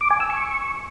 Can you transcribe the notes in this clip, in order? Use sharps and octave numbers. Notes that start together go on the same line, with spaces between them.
D6
G#5
E6
C#6